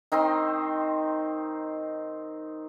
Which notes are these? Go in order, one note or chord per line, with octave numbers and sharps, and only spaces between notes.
D#3 C4 D#4 C6